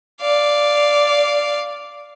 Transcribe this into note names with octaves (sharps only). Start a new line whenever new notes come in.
D5 F5